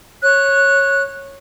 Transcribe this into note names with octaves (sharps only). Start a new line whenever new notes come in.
C#5 F#6